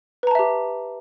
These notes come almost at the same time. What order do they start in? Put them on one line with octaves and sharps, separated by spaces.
B4 A#5 A5 E5 G4